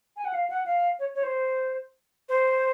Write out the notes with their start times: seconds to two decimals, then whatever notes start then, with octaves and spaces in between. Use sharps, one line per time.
0.16 G#5
0.25 F#5
0.34 F5
0.50 F#5
0.66 F5
0.99 C#5
1.15 C#5
1.23 C5
2.29 C5